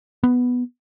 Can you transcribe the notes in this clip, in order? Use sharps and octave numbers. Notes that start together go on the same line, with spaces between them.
B3